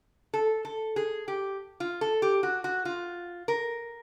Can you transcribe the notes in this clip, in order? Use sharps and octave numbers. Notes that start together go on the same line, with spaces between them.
A4
A4
G#4
G4
F4
A4
G4
F#4
F#4
F4
A#4